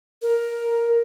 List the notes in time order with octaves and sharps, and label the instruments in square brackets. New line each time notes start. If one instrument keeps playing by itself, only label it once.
[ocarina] A#4